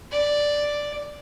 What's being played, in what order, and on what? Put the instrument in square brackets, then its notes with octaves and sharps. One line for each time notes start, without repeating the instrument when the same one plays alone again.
[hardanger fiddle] D5